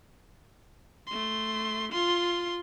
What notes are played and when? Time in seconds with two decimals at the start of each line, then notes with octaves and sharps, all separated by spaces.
1.07 A3 C6
1.92 F4 C6